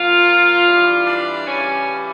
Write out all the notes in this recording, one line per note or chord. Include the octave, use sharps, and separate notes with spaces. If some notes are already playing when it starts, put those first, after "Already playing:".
Already playing: A#2 F3 F4
G2 E3 G3
D4
C#3 E3 G3 C#4